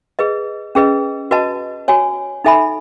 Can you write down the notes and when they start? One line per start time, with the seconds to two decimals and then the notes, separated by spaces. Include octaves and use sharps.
0.19 G#4 B4 D#5
0.75 C#4 G#4 B4 D#5
1.31 F#4 B4 D#5 A5
1.88 F#4 C#5 G#5
2.44 D#4 A4 E5 G#5 B5